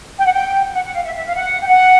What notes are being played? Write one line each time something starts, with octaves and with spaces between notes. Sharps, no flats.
G5
F#5
G5
F#5
F#5
F5
E5
E5
F5
F#5
G5
F#5